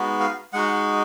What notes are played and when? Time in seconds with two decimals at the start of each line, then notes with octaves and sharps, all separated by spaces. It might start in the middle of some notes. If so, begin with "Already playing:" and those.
Already playing: G#3 B3 D#4 F#4
0.20 F5
0.53 G#3 D#4 F#4 F#5